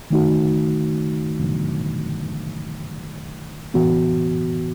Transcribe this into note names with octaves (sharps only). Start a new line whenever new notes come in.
D#3 A3 D#4 F#4
A2 E3 B3 F#4